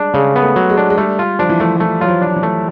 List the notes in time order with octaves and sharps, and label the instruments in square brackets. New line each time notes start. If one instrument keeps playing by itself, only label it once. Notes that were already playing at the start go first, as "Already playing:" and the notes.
Already playing: [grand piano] G3 G#3 [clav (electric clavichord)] D4
[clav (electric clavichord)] C#3 [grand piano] G#3
[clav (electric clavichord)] B3
[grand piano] A3
[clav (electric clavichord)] F#3
[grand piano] G#3
[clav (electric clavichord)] D4
[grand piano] G#3
[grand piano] G3 [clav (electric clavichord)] A3
[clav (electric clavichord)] F4
[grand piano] F3 [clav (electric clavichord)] D4
[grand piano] E3
[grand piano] F3 [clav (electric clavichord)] A3
[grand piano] E3 [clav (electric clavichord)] A3
[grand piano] F#3 [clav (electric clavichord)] F4
[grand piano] F3
[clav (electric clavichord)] D4
[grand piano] E3
[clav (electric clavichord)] A3